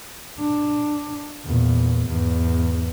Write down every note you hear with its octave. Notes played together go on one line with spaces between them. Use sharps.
D4
E2 A#2
E2 G#2